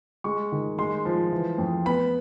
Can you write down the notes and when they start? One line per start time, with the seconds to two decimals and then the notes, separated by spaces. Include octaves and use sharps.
0.24 G#3 C#6
0.52 D#3
0.78 G#3 C6
1.05 F3
1.32 E3
1.58 F2
1.85 B3 B5